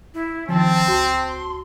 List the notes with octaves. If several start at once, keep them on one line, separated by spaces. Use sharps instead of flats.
E4
D#3 F3 C4 A5
C#2 F#4 A5 C6